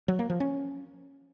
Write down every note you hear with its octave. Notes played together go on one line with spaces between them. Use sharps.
F#3
A#3
F3
C#4